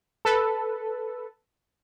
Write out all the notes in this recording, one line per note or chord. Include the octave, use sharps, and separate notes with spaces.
A4 B4